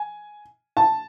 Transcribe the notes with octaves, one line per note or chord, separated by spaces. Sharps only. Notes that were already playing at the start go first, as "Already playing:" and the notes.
Already playing: G#5
A5